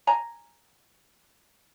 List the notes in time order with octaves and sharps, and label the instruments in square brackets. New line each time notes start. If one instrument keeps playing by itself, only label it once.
[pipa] G#5 A#5